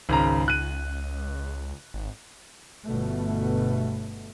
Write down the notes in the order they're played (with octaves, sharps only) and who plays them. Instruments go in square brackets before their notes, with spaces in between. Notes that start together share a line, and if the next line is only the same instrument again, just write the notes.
[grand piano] G#1 C#3 A#5 [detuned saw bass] C#2
[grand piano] F#6 D#7
[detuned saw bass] G#1
[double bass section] G1 B2 A3